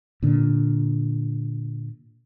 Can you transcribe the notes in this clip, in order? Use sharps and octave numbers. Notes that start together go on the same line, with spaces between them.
A#2 D3